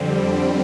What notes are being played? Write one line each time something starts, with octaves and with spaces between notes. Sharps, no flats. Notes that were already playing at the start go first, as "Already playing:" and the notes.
Already playing: F2 D3 G3 C4